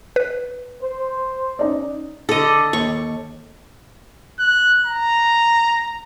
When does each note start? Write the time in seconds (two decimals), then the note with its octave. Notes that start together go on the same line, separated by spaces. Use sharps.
0.16 B4
0.81 C5
1.59 C#4 D#4 D5
2.29 D3 A4 D#5
2.73 D#2 C#6
4.39 F#6
4.86 A#5